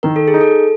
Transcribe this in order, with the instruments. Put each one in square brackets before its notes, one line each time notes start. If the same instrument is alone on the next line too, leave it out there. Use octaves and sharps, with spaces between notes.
[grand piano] D#3 [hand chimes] A#4
[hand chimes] A4
G#4
[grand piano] D#4
[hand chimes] A4